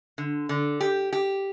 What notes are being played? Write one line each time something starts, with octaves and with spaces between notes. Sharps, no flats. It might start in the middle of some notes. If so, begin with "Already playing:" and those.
D3
D3
G4
G4